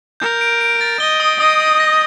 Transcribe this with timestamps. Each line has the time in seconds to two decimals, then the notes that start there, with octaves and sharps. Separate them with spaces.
0.20 A#4 G6
0.41 D7
0.61 D7
0.81 A6
0.99 D#5 G7
1.20 D#6
1.39 D#5 D#6
1.60 D#6
1.80 A#6